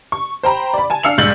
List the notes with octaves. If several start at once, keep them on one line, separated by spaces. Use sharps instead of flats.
C#6
C5 G5 A#5 B5
D5 B5
G#5 A5
D4 F5 E6 C#7 F7
A#1 G2 G#3 G6 A6 F#7